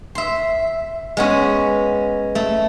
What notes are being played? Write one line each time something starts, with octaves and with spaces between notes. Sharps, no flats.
E5 C6
G#3 B3 C#4
A3